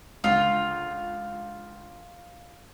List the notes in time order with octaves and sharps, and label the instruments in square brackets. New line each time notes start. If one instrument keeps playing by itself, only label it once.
[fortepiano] C#2 D3 [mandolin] F4